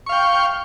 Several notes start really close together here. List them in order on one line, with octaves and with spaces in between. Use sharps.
C#6 F5 G5